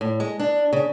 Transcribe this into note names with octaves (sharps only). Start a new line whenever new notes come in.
A2
G#3
D4
C#3